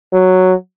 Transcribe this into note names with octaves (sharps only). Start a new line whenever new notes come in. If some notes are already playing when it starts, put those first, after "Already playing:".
F#3